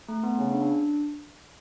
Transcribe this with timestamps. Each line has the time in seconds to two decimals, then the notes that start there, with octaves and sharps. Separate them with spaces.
0.09 A3
0.23 B3
0.39 C#3 C#4
0.50 D4
0.62 D4